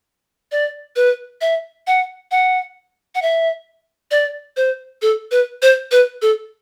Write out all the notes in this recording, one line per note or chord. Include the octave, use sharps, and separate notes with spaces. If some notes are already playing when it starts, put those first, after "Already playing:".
D5
B4
E5
F#5
F#5
F#5
E5
D5
C5
A4
B4
C5
B4
A4